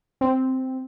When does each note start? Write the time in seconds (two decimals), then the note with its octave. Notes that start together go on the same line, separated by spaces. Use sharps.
0.21 C4